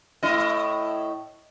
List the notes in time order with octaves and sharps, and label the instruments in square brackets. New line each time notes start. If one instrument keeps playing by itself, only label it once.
[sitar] A2 E4 D#5